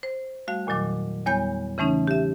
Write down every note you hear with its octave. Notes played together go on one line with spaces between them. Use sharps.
C5
G3 A3 F#4 F5
E2 A#2 D#3 F#3 D6
E2 G3 B3 C#5 G#5 G6
C#3 E3 A3 C#4 D#4
G4 E5